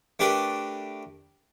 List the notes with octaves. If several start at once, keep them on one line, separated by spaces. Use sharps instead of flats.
A3 D4 G4 A#4 B4